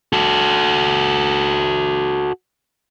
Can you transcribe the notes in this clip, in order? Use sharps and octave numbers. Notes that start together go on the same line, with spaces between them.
F#4 A4